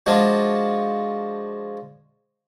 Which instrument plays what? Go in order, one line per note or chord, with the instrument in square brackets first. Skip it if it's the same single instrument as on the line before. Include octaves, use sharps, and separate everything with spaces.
[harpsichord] F3 G#3 D4 F#4